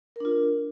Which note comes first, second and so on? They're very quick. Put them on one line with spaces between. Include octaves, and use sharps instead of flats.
A#4 D4 F4